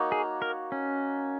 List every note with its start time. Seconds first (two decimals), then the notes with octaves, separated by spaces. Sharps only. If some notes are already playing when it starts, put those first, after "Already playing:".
Already playing: A#3 D#4 F#4 C#5
0.12 G#4
0.42 A#4
0.72 C#4